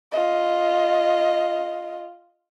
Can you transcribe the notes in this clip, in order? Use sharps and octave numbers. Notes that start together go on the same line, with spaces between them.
F4 D#5